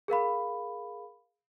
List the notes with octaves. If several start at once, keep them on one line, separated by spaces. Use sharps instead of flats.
G#4 A#4 F5 B5